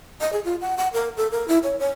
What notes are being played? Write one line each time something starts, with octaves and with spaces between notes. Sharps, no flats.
D#5
G#4
F4
F#5
F#5
A#4
A4
A#4
E4
C#5
C#5